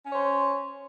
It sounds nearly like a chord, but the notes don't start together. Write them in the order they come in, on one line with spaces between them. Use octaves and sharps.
C#4 C#5 C5